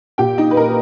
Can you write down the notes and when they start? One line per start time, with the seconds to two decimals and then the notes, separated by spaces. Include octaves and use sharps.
0.18 A#2 G4 G5
0.38 D#4 D#5
0.51 B4
0.57 A#3 A#4